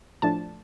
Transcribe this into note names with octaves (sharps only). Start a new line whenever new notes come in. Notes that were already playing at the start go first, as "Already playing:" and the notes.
A2 F3 A3 D4 A5